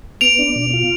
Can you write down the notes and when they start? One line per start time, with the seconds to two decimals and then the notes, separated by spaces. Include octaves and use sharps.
0.21 B3 D7 F7
0.39 D4
0.56 B2
0.73 F4